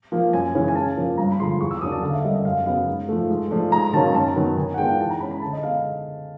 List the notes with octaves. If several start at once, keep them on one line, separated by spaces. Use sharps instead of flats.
F3 A#3
F#2 G#5
C#3 E3 G#3 C#4
G#5
C#3 A5
F3 A#3 C#4
G2 A#5
B5
D3 F3 G#3 C6
E2 C#6
E6
D6
C#3 F#3 A#3 D4 D#6
A5
D3 F5
E5
G3 A#3 C#4 D#5
D#5
F#2 F5
C#3 F#3 B3 F5
G#2
F3 A3
G#2
F3 A3 D4 F4
G#2 A#5
D#3 F#3 A#3 C#4 A5
F#2 A5
D#3 F#3 B3
D#3 G#5
F#5
G#3 B3 D4 F4 G5
E3 A5
A#5
G#3 C#4 B5
B5
D3 A5
D#5
G#3 B3 F5